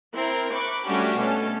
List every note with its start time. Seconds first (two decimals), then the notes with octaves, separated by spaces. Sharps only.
0.14 C4 E4 A#4
0.53 B5 C#6 D6 F#6
0.85 G3 A3 C#4 D4 F#4 G4
1.15 B2 A3 C#4 A4